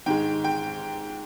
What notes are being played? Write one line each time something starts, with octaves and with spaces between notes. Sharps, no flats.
G#2 D#3 G#3 G5
G5